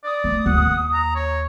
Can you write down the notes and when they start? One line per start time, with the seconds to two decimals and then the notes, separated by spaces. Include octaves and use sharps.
0.04 D5 D#6
0.24 A3
0.46 D2 F#5
0.60 D#2
0.93 A#5
1.15 C#5